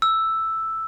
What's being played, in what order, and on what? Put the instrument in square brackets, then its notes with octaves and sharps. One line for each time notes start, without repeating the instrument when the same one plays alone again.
[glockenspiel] E6